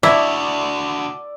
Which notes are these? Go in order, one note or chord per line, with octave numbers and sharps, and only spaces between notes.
D4 E4 F#4 D5 D6 E6